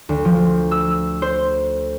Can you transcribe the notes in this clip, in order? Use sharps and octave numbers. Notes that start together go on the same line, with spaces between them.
D2
F3
E6
C5